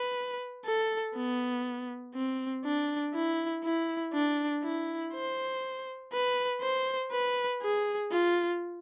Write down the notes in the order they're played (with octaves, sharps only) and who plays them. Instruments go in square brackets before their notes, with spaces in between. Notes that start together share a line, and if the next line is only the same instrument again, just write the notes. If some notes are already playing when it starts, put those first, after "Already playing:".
Already playing: [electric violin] B4
A4
B3
C4
D4
E4
E4
D4
E4
C5
B4
C5
B4
G#4
F4